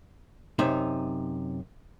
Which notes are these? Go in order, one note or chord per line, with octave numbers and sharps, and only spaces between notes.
F#2 C3 D#4 E5